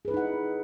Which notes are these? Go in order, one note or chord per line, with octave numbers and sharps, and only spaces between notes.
D#4 E4 G#4 B4 F#5